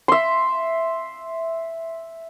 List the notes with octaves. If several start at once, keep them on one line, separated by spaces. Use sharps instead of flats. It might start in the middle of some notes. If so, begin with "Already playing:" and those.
E5 C6